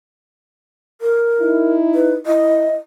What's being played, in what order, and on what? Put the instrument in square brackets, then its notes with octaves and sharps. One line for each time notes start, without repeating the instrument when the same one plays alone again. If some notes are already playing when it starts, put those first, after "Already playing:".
[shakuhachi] A#4
[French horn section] D#4 E4
[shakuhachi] B4
[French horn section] E4 [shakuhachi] D#5